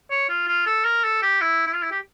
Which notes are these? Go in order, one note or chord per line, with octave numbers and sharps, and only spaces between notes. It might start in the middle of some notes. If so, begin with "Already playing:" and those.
C#5
F4
F4
A4
A#4
A4
G4
E4
E4
F4
E4
G4